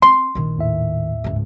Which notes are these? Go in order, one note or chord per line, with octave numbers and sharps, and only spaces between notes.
C4 C6
A#1 D#3
D#2 A2 E5
C#2 G#2